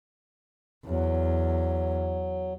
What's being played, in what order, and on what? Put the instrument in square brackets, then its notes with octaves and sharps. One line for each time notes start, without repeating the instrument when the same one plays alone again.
[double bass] E2 [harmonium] F#3